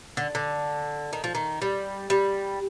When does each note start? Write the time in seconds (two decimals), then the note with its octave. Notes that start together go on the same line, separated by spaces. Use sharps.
0.17 D3
0.35 D3
1.13 D#3
1.24 F3
1.35 D#3
1.62 G3
2.10 G3